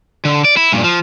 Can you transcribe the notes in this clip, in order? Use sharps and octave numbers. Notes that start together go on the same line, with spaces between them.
D3
D5
E4
G2 A#2
F3